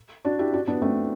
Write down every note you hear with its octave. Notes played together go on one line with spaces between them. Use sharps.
D4 F#4
E4 G4
D4 F#4
B3 D4
A3 C4